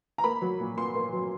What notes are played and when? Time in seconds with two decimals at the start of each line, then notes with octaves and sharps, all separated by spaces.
0.18 A#5
0.24 A#3 B5
0.42 F#3
0.60 A#2
0.77 A#2 C6
0.95 A#3
1.13 F#3